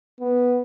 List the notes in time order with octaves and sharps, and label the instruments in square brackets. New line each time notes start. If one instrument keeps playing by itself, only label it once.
[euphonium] B3